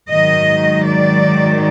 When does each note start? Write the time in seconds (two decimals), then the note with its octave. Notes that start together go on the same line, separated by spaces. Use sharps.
0.11 G#2 D#3 F#3 D#5
0.87 D5